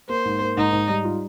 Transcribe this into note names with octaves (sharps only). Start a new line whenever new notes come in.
A#3 C5
G#2
A#3
G#2 D#4
G#2
G3
F4